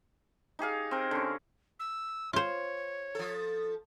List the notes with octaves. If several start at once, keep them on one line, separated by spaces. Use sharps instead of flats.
D#4 G4 G#4 F5
C4 A#4
D3 C#4
E6
F4 C5 C#5
F3 A4